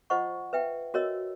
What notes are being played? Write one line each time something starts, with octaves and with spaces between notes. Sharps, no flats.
F4 C5 D#5 F#5 C#6
B4 E5 G5
F#4 A#4 C#5 D#5 E6